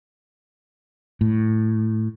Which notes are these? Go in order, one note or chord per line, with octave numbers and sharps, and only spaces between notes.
A2